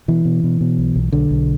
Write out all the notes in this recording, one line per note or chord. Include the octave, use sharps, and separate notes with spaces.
B2 E3
B2
B2
B2
B1
B1
B1 D3
B1